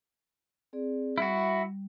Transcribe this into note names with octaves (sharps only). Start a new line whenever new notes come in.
C4 G#4 D5
G3 E4 F#4